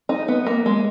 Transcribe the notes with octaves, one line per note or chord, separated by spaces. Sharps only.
D#4
B3
A#3
G#3